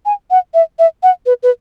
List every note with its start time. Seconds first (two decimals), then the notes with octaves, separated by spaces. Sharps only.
0.06 G#5
0.31 F#5
0.54 E5
0.79 E5
1.03 F#5
1.26 B4
1.43 B4